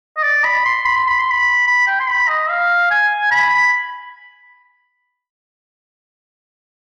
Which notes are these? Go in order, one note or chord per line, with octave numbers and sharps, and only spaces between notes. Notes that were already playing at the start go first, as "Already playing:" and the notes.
D#5
D5
B5
C6
B5
C6
B5
C6
B5
B5
G5
C6
B5
D#5
F5
G#5
B5